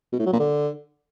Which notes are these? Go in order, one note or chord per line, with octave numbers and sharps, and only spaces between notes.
B2
A2
F#3
A#2
D3